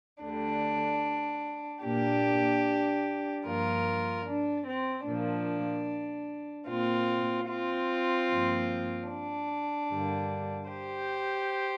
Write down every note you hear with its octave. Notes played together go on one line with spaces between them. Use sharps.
D2 D3 G3 D4
A#2 A#3 D4 G4
G2 F3 A#3 F4 A#4
D4
C4
A#2 F3 A#3 D4
A#2 A#3 C4 F4
C4 F4
G2 F3 A#3
D4
G2 D3 G3 A#3
G4 C5